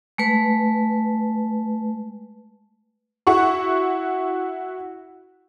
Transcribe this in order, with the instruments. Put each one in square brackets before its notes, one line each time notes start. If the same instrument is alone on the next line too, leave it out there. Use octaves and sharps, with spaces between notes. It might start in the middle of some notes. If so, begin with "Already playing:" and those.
[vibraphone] G#3 A3 B4
[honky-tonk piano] E4 F#4 F#5 C#6